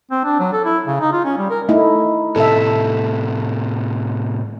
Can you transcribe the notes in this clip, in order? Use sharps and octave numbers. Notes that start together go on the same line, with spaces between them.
C4
D4
F#3
A4
E4
C#3
D#4
F4
C#4
G3
A#4
A3 D#4 E4
A2 C3 A4 E5